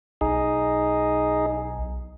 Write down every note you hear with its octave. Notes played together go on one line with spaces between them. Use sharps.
B1 D#4 G#4